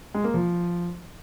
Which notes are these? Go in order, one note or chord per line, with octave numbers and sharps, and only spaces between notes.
G#3
A#3
F3